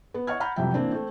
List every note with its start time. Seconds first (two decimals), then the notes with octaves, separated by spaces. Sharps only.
0.14 B3
0.27 C#5 D#5 F#5 C#6 F6 G#6
0.40 F#5 A#5 B5 F6 G6
0.56 F2 C3 F#3 G3 E5 G5
0.74 E3 A#3 C4 D4
0.93 A3 C4